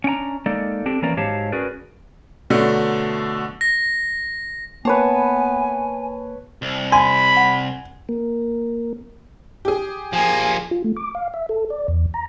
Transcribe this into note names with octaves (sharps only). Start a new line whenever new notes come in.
C#4 D4 G5 A#5
G#3 A#3 D#4 A4 D5
C4 D4 G4 A4
E3 A#3 C#4 D5 A#5
G#2 F#3 G4 C#5 F5 A5
C#4 F#4 G#4 A#4 B4 D5
B2 D3 F#3 A3
A#6
A#3 B3 B4 C#5 G#5 A5
C2
G#5 B5 C6
F#5
A#3
G4 G#4
F3 A#3 G#5
F4
A3
D6
F5
E5
A4
D5
E2
A#5